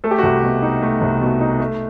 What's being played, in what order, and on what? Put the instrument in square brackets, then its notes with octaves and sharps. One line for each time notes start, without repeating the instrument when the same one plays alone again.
[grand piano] A3 A4
G4
F#4
C2 G4
B2
D#4
A3
C2
B2
D#4
A3